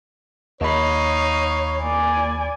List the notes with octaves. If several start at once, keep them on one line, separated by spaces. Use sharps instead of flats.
D#2 D#4 C#5 F5 B5
A#3 D5 G#5